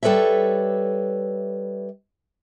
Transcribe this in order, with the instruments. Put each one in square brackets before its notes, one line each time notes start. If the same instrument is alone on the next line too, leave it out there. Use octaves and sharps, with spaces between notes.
[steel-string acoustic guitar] G3 A4 B4 C#5 E5